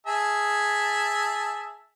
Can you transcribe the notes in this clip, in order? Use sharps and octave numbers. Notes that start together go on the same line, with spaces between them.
G#4 E5 A5